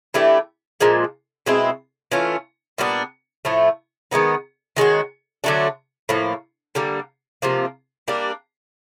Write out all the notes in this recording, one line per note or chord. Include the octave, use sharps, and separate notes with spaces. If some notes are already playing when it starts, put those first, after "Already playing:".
E3 A3 D4 G4
A#2 F3 G#3
B2 G#3 C4 E4
E3 A3 C#4 F4
A#2 G3 B3 D4
A2 F3 A3
D#3 G#3 B3 D#4
D#3 G#3 C#4 F#4
D3 F#3 A3 D4
A2 F3 A#3
D3 G3 A#3
C3 F3 A#3
G3 A#3 D4